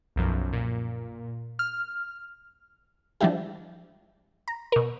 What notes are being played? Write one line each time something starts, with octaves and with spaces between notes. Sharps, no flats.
B1 F#2 F3
A#2
F6
F3 G3 G#3 D4 E4 G4
A#5
B2 A#4